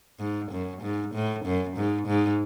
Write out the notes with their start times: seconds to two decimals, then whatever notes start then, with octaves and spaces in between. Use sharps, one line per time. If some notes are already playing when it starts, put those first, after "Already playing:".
0.20 G#2
0.51 F#2
0.82 G#2
1.14 A2
1.45 F#2
1.77 G#2
2.07 G#2